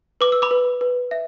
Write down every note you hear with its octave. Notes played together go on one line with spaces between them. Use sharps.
B4 D6
E6
B5 D6
B4
B4
E5